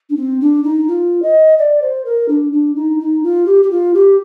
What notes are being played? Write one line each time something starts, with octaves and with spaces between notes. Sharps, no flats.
D4
C4
D4
D#4
F4
D#5
D5
C5
A#4
D4
D4
D#4
D#4
F4
G4
G4
F4
G4